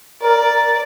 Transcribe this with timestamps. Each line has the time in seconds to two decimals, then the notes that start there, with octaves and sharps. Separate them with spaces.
0.22 A#4 D5